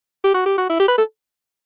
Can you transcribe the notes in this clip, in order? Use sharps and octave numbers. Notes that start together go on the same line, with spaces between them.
G4
F#4
G4
F#4
E4
G4
B4
A4